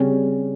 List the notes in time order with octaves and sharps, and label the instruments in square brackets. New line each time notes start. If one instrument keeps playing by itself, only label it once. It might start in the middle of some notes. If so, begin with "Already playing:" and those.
Already playing: [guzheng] C#3 G3 C#4 [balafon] C4